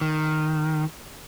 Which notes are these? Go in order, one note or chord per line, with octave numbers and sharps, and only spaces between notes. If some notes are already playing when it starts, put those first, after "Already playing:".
D#3